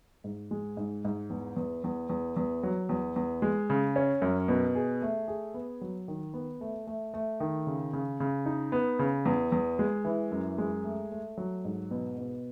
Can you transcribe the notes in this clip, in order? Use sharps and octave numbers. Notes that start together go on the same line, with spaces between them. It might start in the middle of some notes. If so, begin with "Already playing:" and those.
G#2
G#3
G#2
G#2
E2
E2
E2
E2
E2
F#3
E2
E2
G#3
C#3
C#4
F#2
B2
G#4
A3
G#4
B3
F#3
D#3
B3
A3
A3
A3
D#3
C#3
C#3
C#3
D#4
B3
C#3
E2
E2
G#3
E3
F#2
G#3
A3
A3
F#3
G#2
B2
B2